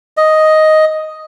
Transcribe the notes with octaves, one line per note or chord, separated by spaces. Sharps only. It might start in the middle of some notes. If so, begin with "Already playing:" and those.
D#5